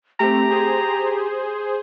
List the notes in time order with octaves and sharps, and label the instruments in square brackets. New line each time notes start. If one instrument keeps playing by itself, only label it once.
[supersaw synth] A3 C4 [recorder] G4 [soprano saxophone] A#5
[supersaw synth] G#4 C5